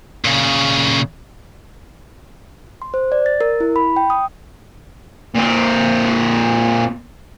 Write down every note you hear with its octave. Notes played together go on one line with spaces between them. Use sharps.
A#2 C#3
C6
C5
D5
A6
A#4
E4
B5
G5
D#6
A#2 C4